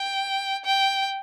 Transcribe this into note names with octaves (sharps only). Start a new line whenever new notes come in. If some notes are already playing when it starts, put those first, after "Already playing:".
Already playing: G5
G5